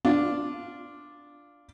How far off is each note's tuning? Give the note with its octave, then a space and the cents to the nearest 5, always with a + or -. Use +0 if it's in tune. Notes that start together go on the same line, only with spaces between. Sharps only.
D4 +0 F4 +0